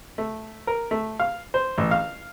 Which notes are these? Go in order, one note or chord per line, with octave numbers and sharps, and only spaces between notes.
A3
A#4
A3
F5
C5
A1
F5